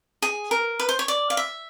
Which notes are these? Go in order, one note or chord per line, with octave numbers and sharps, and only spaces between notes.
G#4
A#4
B4
C5
C#5
D5
F5
E5